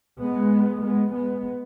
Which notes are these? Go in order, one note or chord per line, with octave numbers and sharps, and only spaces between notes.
G#3 B3
G#3 B3
G#3 B3